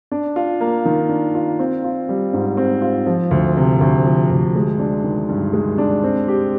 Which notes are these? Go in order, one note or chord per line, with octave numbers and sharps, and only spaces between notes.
D4
F4
A#3
D#3
D4
F4
C4
F4
G3
G#2
C4
F4
F3
D2
C3
D2
F3
D2
G#3
D4
D#3
G2
G#3
D4
C4
G4